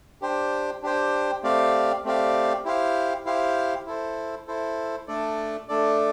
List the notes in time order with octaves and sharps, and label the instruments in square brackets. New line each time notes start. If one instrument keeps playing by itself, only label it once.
[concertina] D4 G4 C5 G5
D4 G4 C5 G5
A3 C4 G4 D5 F5
A3 C4 G4 D5 F5
E4 G4 C5 F5
E4 G4 C5 F5
E4 A4 C5
E4 A4 C5
A3 D4 A4 D5
A3 D4 A4 D5